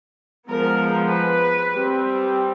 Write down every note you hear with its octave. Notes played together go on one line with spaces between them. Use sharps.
F3 G#3 B3 A#4
B4
G3 C4